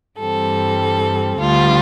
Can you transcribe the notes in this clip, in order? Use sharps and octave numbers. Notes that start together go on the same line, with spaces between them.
G2 E3 G3 C4 A4
D2 D3 G3 F4